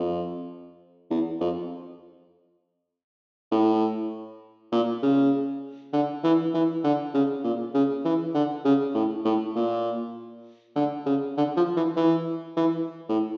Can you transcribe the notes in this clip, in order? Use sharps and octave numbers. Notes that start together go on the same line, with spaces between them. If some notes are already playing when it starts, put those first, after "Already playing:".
Already playing: F2
E2
F2
A2
A#2
C#3
D3
E3
E3
D3
C#3
A#2
C#3
E3
D3
C#3
A2
A2
A#2
D3
C#3
D3
F3
E3
E3
E3
A2